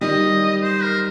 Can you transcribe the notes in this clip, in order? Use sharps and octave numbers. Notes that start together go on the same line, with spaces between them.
D#3 G3 D#5
C5
A#4